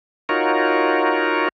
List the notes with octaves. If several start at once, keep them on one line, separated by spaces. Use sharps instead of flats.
D#4 F4 F#4 A#4 C#5